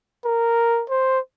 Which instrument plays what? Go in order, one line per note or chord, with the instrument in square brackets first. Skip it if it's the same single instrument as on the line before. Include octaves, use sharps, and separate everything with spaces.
[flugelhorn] A#4
C5